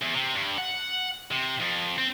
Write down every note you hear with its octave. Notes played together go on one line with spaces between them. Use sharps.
E2
C3
G2
F#5
C3
F2
C4